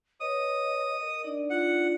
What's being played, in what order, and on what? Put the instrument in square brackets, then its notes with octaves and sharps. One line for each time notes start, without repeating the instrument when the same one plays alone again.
[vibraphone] B4 C#5 [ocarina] D#5 [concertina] D#6
[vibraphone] A#4
D4 D#4 D5
[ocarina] F4 [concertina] F#5